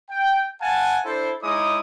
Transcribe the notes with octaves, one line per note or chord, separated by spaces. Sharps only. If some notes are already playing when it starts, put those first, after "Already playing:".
G5
F5 F#5 G#5 A5
D4 E4 A4 C5
G#3 D#4 E4 C#5 D6 D#6